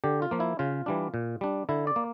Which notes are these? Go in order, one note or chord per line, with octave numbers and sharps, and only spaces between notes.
D3 G4
F4
F3 A#3
E4
C#3 F4
E3 G3 D4
A#2
G3 D4
D3 E4
D5
A#3